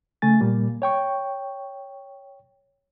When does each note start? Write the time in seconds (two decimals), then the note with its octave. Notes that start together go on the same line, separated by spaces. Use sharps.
0.22 C#3 A3 G#5 A6
0.41 A#2 G3 A#3
0.82 C#5 G5 C#6